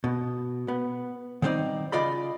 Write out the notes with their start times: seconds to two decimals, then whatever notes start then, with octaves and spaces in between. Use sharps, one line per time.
0.04 B2
0.68 B3
1.42 D#3 G3 C4 D#4 D5
1.92 C#3 F4 D5 D#5 B5